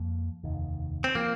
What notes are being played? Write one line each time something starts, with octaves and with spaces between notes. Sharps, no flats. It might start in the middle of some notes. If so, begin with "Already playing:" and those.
Already playing: F2 F3 A#3
F1 D#2 D#3
C4
F3 A#3 C4